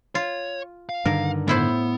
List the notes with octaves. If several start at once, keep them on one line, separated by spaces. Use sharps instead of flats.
F4 C#5
F5
G2 D3 D#3 A#4
A2 B3 E4 C5